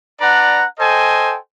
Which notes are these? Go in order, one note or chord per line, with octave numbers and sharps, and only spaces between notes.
D4 B4 D5 F#5 A#5
A4 C5 D#5 G5 G#5